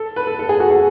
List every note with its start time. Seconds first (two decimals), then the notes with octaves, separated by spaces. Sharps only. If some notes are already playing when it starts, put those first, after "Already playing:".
Already playing: A4
0.16 B4
0.27 A4
0.39 A4
0.49 G#4
0.60 F#4
0.71 G#4